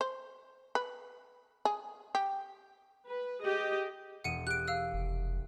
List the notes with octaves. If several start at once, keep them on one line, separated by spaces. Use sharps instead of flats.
C5
B4
G#4
G4
B4
G4 G#4 D#5
E1 F#5 D#6 C#7 D#7
G4 F#6 D7
F5 E6
F1